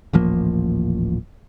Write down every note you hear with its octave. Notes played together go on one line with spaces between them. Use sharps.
D#1 A1 F3 A#3